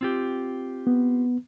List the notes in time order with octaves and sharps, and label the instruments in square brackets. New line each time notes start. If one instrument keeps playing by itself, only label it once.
[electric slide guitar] C4 F4 G4
[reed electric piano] B3